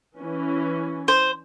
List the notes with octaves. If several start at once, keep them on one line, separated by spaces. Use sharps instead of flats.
E3 C#4
C5